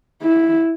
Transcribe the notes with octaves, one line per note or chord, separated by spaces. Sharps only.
E4